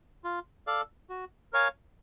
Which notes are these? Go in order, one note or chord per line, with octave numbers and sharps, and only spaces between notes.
F4
A4 D5 F5
F#4
A#4 C#5 F5 G#5